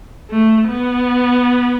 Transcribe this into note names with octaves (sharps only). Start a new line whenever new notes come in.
A3
B3